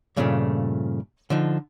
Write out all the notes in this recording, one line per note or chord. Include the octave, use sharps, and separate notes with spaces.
G2 A#2 C#3 F3 G#3 A3
D3 F3 D#4